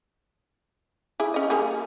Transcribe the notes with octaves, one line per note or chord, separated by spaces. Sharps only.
E4 G#4
C#4 D#5
G3 A#3 G#4